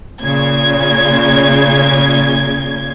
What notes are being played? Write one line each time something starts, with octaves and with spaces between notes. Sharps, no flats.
A#2 C#3 G#6